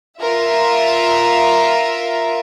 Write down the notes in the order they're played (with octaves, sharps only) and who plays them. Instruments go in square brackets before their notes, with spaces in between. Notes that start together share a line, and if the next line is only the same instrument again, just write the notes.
[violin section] F4 A#4 E5